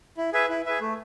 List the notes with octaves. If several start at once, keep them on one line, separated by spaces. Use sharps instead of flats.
E4
G#4 B4 E5
E4
G#4 B4 E5
A3